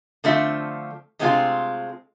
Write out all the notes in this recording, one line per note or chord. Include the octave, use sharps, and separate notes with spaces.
D3 F3 A3 C4 F4 E5
C3 G#3 A3 C4 D#4 F4